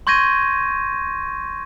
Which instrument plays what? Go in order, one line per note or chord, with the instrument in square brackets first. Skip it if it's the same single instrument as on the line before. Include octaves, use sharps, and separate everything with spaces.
[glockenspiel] C6 C#6 G6 G#6 A#6 D#7